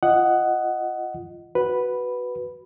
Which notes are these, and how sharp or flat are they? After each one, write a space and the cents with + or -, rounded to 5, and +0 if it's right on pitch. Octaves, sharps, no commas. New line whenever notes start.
F4 -15 D#5 +0 F#5 +10
F#4 +5 B4 +0